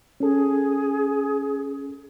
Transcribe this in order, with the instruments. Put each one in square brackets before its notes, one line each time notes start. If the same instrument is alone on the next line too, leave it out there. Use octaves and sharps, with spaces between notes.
[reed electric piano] C#4 A4 [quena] G#4